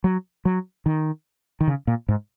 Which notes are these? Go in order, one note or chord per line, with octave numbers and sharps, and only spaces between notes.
F#3
F#3
D#3
D#3
C#3
A#2
G#2